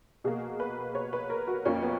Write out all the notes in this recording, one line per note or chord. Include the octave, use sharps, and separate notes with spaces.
B2 A#3 G#4
B4
C#5
B4
A#4
F#4
F2 F3 A#3 C#4
B3